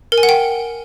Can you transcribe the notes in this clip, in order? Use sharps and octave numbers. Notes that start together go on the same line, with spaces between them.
A#4
G#5
F#5
G5